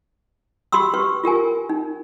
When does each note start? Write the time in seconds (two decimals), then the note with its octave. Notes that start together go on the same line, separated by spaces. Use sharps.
0.72 F#4 G4 B5 C6 E6
0.94 G4 B4 C#6
1.24 F4 G4 A#4 G#5
1.70 D#4